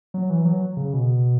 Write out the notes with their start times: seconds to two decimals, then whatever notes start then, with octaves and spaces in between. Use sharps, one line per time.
0.14 F#3
0.30 E3
0.45 F#3
0.77 C#3
0.93 B2